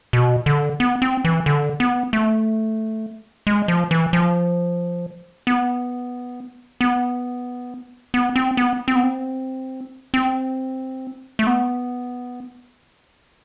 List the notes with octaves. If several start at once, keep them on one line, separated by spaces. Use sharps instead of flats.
B2
D3
B3
C4
E3
D3
B3
A3
G#3
F3
E3
F3
B3
B3
B3
C4
B3
C4
B3
C4
C4
A3
B3